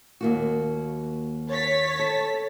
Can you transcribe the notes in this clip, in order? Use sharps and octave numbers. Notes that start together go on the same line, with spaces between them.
D#2 A#3 F#4
C#5 A6 B6
A4